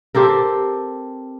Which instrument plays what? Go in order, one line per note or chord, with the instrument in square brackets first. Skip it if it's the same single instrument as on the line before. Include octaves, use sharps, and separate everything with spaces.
[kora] C4 G4 A4 A#4